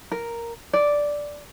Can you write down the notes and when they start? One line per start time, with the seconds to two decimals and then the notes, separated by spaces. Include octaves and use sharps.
0.11 A#4
0.73 D5